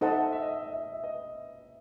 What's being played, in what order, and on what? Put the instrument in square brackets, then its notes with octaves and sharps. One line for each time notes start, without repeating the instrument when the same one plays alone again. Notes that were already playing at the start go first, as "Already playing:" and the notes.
[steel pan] D#4 A4 C5 F#5 A5 [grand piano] D#5
[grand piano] E5
D#5
E5
D#5
E5
D#5
E5
D#5
E5
B4 D#5